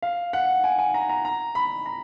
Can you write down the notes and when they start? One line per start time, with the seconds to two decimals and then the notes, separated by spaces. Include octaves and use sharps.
0.02 F5
0.33 F#5
0.64 G#5
0.79 G#5
0.94 A#5
1.09 A#5
1.25 A#5
1.55 B5
1.86 A#5